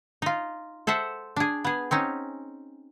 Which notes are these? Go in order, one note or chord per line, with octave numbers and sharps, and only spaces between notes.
D#4 F4
A4 C5 E5 F#5
D4 G#4
B3 G#4
C4 C#4 D#4